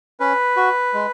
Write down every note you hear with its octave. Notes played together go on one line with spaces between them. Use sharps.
C#4 B4
F#4
G#3